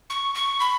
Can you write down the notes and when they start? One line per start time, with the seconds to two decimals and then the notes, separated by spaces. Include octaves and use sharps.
0.10 C#6
0.35 C#6
0.60 B5